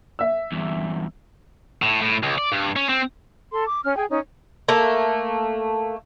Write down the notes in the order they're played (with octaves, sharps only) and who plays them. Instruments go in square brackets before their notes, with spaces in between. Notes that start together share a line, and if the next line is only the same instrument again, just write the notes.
[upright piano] E5 E6
[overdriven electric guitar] E2 G2
[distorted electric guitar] A2
A2
C#2
D5
G2
C#4
C4
[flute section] A4 C6
D6
C#4 F6
G#4 G5 G#5
C#4 D#4
[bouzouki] A3 A#3